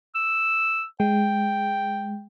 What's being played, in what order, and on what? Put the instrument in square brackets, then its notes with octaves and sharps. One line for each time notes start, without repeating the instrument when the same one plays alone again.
[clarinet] E6
[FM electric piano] G#3 [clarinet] G5